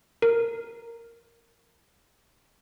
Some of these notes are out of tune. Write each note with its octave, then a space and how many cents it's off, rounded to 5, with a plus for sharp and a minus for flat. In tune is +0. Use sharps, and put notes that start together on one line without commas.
A#4 -5